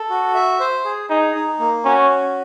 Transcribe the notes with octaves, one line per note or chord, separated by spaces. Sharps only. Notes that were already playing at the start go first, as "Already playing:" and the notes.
Already playing: A4
F#4
E5
C5
G#4
D#4 G#4
D#4
A#3
C#4 F#4
C#4